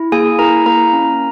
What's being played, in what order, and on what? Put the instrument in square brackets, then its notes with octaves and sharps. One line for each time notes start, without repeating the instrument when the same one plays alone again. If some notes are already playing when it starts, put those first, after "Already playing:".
Already playing: [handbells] E4
A#3 G#4 G#5
E4 A#4 A#5
A#3 A#4 A#5
C#4